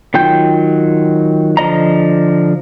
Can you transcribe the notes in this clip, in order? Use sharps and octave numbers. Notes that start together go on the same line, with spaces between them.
D#3 F#3 F4 G5 G6
D3 F3 D#5 A#5